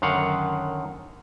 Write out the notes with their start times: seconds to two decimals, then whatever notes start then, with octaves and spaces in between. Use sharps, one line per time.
0.02 F#2 D3 D#3 F5 F#5